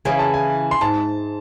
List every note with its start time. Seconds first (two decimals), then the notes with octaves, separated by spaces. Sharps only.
0.05 C#3 E3 G#5
0.19 A5
0.34 G#5
0.71 C6
0.81 G#2 A5